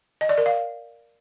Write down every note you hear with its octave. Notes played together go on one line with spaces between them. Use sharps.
D#5
D5
A#4
F5